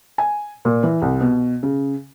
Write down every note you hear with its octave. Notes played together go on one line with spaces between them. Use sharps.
G#5
A#2
E3
C2
B2
C#3